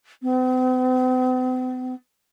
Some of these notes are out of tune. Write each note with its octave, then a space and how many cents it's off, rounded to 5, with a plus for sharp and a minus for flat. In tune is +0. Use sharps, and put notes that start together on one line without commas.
C4 -45